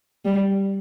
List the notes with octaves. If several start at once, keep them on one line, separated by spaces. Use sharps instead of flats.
G3